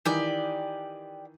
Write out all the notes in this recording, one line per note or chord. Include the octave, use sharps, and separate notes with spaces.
D#3 E3 G4 D5